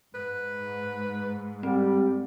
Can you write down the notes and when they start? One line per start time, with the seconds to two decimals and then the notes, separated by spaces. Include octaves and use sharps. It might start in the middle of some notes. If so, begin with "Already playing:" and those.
0.15 G#2 B4
1.63 G3 C4